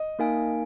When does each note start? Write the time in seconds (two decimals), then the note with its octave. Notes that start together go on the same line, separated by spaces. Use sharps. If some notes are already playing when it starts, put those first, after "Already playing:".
Already playing: D#5
0.19 A#3 D#4 A#4 F5 G#5